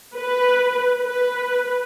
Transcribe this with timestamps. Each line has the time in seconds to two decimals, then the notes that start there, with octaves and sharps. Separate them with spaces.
0.17 B4
1.02 B4